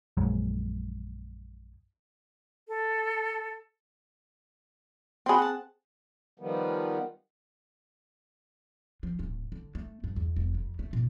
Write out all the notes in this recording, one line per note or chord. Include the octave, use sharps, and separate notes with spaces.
A#1 F#2 G#3
A4
C4 F#4 G#4 B5 C6
F#5 A5
D#3 F3 G3 B3
F3
D1
D3
A3
G2
E2
F1
F2
A3
A#2